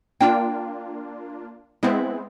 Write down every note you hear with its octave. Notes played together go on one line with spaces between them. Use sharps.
A#3 D4 F4 G5
G#3 B3 C4 E4